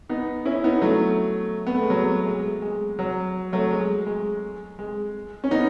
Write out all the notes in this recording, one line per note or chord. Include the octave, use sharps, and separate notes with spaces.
B3 D#4
C#4 E4
B3 D#4
F#3 A3
B3
A3
G#3
F#3
A3
G#3
G#3
F#3
F#3 A3
G#3
G#3
G#3
C#4
B3 D#4